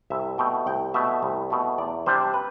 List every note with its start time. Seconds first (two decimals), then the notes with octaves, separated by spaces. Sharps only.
0.10 C2 E5
0.38 B2 A3 G5
0.66 C2 G5
0.94 B2 A3 E5
1.23 C2
1.50 B2 A3
1.78 E2 D5
2.06 C3 G3 D4 C5
2.34 B4